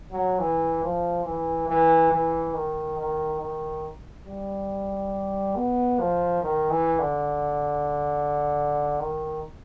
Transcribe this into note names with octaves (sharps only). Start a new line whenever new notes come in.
F#3
E3
F3
E3
E3
E3
D#3
D#3
D#3
G3
B3
F3
D#3
E3
D3
D#3